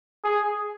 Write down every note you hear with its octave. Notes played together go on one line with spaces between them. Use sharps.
G#4